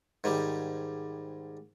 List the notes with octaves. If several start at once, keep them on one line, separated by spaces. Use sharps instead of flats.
G#2 D#3 G3